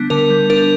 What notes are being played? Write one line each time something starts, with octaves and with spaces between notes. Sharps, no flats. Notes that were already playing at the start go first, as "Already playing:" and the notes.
Already playing: D3 G3 B3 D4
D3 A#4
G3
D4 A#4